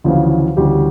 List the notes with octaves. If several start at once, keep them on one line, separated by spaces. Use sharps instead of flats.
D2 C#3 E3 F3 F4
D2 C#3 E3 G3 G4